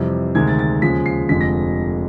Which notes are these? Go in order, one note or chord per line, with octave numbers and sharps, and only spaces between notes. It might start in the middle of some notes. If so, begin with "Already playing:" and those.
Already playing: F2 C3 E3 G3
D2 C3 D#3 G#3 G#6
A6
A6
D#2 C#3 F3 G#3 B6
C7
F1 F2 D3 F3 G#3 B6
A#6